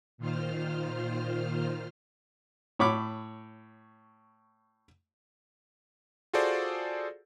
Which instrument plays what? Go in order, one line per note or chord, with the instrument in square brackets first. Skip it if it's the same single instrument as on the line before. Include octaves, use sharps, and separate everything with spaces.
[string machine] A#2 D#3 F4 C5 F6
[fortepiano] A2 C#5 B5 D6
[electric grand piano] F4 F#4 G#4 A4 C5 D5